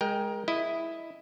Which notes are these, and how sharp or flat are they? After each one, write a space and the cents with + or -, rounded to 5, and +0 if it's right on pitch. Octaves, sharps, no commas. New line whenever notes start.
G#3 -5 A#4 +20 G5 +0
E4 +0 D#5 +0